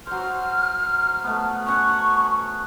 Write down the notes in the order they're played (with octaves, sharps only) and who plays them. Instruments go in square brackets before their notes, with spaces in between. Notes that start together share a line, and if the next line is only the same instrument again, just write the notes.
[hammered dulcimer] F#3 C5 [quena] F6
[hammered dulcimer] A3 B3
[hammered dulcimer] C#4 F#5 [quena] C#6